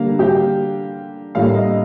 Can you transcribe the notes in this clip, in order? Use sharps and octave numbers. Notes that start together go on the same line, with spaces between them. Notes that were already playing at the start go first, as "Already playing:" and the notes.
Already playing: D3 G3 A#3 F5
G4
A2 G3 A#3 F5
D#5